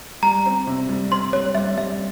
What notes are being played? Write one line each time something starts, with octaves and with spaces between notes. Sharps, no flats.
G3 A#5
C4
C3
G3
C4 C6
G3 C#5
G3 E5
G3 E5